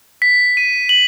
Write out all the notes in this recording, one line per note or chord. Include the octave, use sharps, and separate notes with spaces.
B6
D#7
F#7